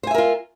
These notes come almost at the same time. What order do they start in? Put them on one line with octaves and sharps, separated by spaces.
C5 G#5 E5 A#4 F4